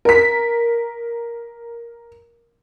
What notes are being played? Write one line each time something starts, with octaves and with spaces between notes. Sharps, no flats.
A#4 B6